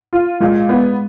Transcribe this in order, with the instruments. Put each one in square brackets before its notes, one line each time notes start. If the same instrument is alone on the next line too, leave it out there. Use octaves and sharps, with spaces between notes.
[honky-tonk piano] F4
[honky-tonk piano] A#2 [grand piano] G#3
[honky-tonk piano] B3